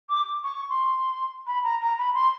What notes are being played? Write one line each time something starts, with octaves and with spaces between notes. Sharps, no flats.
D6
C#6
C6
B5
A#5
A#5
B5
C6